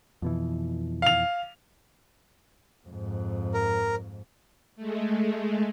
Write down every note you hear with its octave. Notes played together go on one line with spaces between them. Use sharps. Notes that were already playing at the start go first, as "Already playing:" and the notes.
F2 B2 E3
F5 F7
F2 G#2
A#4
G#3 A3